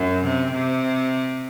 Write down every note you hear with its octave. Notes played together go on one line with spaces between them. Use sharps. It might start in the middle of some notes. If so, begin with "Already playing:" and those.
Already playing: F#2
C3
C3